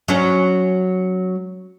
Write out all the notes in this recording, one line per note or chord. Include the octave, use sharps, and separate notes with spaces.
F#3 C#4